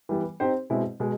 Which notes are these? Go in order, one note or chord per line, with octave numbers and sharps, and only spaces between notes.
E3 G3 B3
C4 D#4 G4 C5
B2 G#3 C4 E4
B2 G#3